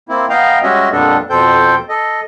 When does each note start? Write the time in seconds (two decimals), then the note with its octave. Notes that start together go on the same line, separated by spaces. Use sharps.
0.09 A#3 C4 E4
0.30 B3 D#5 F5 G5 A#5
0.63 G3 G#3 C#4 F#4 D#5 E5
0.92 F2 A#2 G3 B3 D4 A4
1.30 F2 B2 A4 C5 G5 G6
1.89 A4 D#5